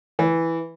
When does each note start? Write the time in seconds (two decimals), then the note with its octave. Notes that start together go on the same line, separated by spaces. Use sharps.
0.19 E3